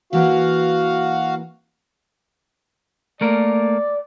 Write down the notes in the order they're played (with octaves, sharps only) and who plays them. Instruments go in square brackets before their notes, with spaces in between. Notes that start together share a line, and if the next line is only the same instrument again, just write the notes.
[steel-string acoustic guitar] E3 A#3 B4 [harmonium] F#4 F5
[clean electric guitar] A3 A#3 A#4 [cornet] D5